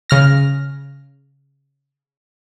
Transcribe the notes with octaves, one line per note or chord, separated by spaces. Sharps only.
C#3 F6 A#6